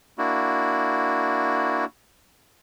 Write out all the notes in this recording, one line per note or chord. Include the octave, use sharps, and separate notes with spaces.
A#3 D4 E4 F#4